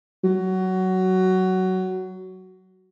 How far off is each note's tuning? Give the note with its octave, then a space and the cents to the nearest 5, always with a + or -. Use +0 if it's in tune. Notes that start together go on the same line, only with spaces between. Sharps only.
F#3 +15